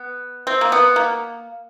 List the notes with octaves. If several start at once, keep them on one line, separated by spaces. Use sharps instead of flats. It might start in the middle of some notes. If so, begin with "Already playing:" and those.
Already playing: B3
C4
A#3
B3
A#3